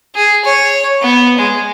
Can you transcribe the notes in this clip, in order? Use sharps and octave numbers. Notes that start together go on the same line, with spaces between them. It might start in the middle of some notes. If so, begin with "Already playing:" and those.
G#4
C#5
B3
G#3